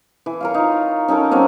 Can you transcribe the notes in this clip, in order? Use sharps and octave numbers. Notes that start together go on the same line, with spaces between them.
E3
A#4 C#5 F5
D#4 F4
C#4 D#4 A4 A#4
F#3 A#3 C4 C#4